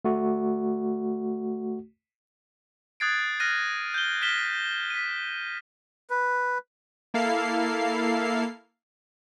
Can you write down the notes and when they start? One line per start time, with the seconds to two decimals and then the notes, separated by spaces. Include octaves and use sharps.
0.05 A3 F#4
3.00 D#6 F#6 G#6 A6 C7 D7
3.40 F6 F#6 A#6 D#7
3.94 G6 G7
4.22 F6 B6 E7 G7
4.90 B6 D#7
6.10 B4
7.14 A#3 E4 A4 F5 C7